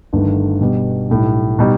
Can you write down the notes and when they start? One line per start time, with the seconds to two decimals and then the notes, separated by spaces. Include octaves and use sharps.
0.13 G1 G2 D#3 A3
0.61 B2 G3 B3
1.10 B1 A2 G3
1.59 B2 G3 D#4